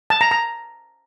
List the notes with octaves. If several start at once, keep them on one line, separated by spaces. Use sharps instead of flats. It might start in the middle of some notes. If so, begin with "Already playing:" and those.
A5
A#5
A#5